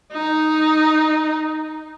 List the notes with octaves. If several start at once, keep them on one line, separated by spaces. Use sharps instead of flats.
D#4